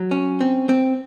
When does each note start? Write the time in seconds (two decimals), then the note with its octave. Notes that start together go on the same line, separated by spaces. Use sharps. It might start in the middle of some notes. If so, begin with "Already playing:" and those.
Already playing: F#3
0.11 C#4
0.41 C4
0.69 C4